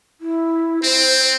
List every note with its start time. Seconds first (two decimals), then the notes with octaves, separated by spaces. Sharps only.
0.21 E4
0.84 C4 C5